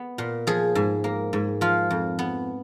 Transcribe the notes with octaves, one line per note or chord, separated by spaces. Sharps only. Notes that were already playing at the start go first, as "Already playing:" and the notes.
Already playing: B3
A#2
F3 G#4
G#2
A#3
G#2
F3 F4
F2
B3